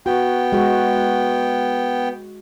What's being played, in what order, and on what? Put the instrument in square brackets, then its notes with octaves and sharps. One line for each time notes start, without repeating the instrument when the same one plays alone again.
[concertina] B3 G5 [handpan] F#4
[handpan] G#3 F#4